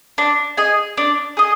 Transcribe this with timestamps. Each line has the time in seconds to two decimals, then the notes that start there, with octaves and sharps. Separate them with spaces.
0.18 D4
0.57 G#4 D#5 G#5
0.97 D4
1.37 G#4 D#5